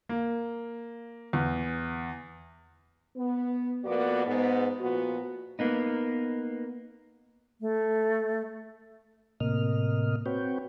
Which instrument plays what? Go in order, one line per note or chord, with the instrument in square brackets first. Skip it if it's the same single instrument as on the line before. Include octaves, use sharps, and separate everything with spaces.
[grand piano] A#3
E2
[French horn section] B3
F2 A#3 B3 F#4 D5
G#2 B3
A#2 F3 B3 F#4
[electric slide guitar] A#3 B3 D#4
[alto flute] A3
[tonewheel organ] A2 C3 A#3 D#5 F6
C4 F#4 B4 C#5 G5